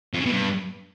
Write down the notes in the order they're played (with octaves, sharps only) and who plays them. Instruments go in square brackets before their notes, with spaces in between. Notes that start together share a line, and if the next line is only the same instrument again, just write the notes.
[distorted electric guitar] F2
C#3
B2
G2